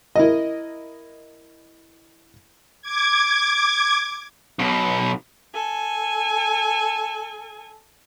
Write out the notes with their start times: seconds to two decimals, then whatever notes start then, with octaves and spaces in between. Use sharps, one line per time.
0.16 E4 A#4 D#5
2.82 D6 G#6
4.59 B1 B2
5.54 A4 G#5